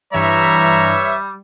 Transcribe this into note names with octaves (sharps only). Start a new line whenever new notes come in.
G2 E3 G3 B4 C#5 E5 A#5 B6